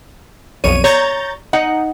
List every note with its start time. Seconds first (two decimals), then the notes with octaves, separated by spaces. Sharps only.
0.64 B1 F2 C#5 D#7
0.84 C#5 A#5 G6 A6
1.53 D#4 F#5